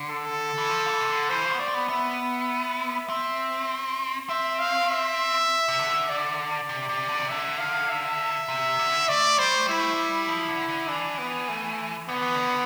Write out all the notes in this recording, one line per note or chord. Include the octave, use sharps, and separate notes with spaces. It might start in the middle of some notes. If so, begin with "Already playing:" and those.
Already playing: D3
A4
E3
F3
D3
E3
C3
D3
E3 C5
F3
B3
A3 D5
C4
B3
B3 E5
C4 E5
C4 E5
F5
E5
C3
D3
D5
C3
C3
D3
C3
D3 E5
F5
E5
C3
D3
A3 D5
G3 C5
A3
G3 E4
A3
G3
F3
D3
D3
E3 D4
B3
A3
D3 B3
E3
D3